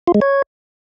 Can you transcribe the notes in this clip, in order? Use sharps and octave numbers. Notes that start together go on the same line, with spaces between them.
F4
G#3
C#5